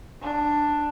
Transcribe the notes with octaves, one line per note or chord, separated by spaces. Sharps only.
D4